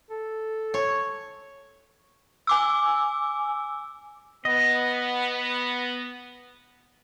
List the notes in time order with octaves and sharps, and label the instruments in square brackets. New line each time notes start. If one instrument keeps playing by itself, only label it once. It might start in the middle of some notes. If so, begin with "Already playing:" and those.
[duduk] A4
[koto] C#5
[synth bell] G#5 D6 E6
[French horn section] B3 [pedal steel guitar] D#5